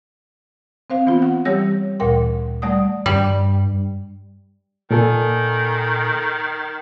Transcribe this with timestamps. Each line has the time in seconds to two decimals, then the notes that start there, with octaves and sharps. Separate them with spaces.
0.90 C4 C5 F5
1.07 E3 B3 C4 F4
1.22 F#5
1.45 E3 G3 G4 C#5 E6 A#6
2.00 D2 A#2 E3 A#4 G5 C6
2.62 G3 A3 D5 F#5 D#6
3.06 G2 G3
4.91 A#2 D#3 A4 G#5